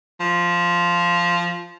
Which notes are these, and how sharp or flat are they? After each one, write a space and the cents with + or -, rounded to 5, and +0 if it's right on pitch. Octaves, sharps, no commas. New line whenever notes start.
F3 -5